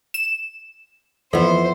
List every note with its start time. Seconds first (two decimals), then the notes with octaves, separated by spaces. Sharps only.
0.14 E7
1.33 F2 E3 B3 C5